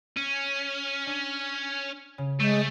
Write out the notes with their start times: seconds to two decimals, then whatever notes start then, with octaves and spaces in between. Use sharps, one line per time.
0.17 C#4
1.07 D4
2.18 C#3
2.40 G#3 A3 C#6 G6 D#7